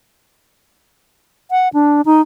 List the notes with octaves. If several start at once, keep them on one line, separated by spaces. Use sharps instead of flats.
F#5
D4
D#4